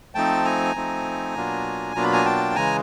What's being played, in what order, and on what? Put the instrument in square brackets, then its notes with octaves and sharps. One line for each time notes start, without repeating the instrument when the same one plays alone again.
[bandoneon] F3 A3 C4 D#4 G5 A5
G#5 A#5
F3 A3 C4 D#4
B2 F#3 A#3 D4 F4
B2 F#3 A#3 D4 F4 A#5
B5
G#5 A#5
G5 A5
C#3 E3 G#3 G#5 A#5